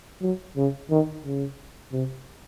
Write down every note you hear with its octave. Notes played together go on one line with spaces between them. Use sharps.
F#3
C#3
D#3
C#3
C3